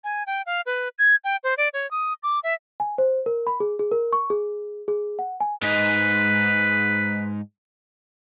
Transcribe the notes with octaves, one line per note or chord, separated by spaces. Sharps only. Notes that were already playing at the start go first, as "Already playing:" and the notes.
G#5
G5
F5
B4
G#6
G5
C5
D5
C#5
D#6
D6
E5
G#5
C5
A#4
B5
G#4
G#4
A#4
C#6
G#4
G#4
F#5
G#5
G#2 D#4 B4